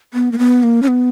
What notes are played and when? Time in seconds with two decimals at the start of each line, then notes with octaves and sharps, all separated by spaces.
0.14 B3
0.32 A#3
0.39 B3
0.63 A#3
0.83 C#4
0.88 B3